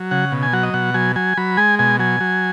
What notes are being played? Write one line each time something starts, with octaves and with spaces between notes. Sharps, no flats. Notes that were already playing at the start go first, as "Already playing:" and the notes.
Already playing: F#3
C#3 F#5
B2
G#5
F#3 F#5
D#5
B2 F#5
F#3 G#5
F#3 G#5
F#3 B5
G#3 G#5
B2 G#5
F#3 G#5
F#3